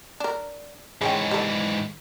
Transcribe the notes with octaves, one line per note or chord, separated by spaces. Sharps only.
D4 A#4
G#2 E3 G#3 C#4 G5
G3 A4